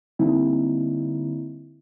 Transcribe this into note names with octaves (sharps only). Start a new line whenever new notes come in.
D3 G3 A#3 C4 D#4 E4